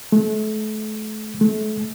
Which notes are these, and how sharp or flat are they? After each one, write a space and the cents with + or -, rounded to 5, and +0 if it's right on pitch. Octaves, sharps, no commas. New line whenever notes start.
A3 -35
A3 -35